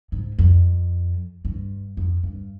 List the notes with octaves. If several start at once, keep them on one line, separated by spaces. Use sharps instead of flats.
G#2
F2
G2
F2
G2